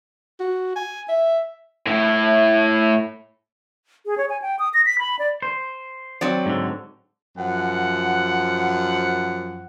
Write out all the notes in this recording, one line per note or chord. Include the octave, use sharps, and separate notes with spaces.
F#4
G#5
E5
A2 E4
G#4
C#5
G#5
G5
D#6
A#6
B6
B5
D5
C5
F#3 C4 D5
G#2 D3
F#2 F3 F#5